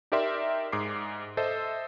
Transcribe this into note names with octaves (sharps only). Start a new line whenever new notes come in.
D#4 G4 A#4 D5 E5 C6
G#2 G#4 D6 C7
A4 C5 D#5 E5